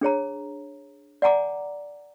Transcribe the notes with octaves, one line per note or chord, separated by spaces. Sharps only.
D4 G#4 C#5 A#5
D5 F#5 G#5 A#5 D6